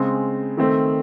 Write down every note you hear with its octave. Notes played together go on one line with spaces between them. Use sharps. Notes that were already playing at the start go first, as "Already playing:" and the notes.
Already playing: C#3 G#3 C4
D#3 A3 C4